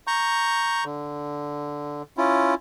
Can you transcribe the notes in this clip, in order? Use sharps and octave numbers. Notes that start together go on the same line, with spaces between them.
A#5 C#6 G6
D3
C#4 E4 F4